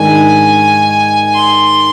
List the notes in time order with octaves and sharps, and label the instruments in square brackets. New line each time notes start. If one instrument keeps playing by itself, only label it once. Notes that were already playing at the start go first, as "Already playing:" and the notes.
Already playing: [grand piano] G#2 D#3 G#3 D4 [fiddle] G#5
[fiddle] C6